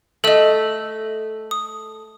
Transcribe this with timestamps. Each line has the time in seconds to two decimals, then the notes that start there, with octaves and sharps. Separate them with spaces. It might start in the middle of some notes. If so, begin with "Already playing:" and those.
0.24 A3 A4 D#5 E5 E6
1.51 D#6